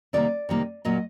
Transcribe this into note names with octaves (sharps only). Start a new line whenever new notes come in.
C3 D#3 G3 A#3 D5
C3 D#3 G3 A#3
A#2 F#3 A#3 D#5